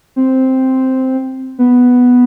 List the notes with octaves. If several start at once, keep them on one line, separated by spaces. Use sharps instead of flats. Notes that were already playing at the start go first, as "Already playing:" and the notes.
C4
B3